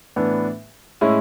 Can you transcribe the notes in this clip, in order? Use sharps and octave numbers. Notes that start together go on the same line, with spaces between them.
A2 E3 B3 D4
A2 G#3 C#4 E4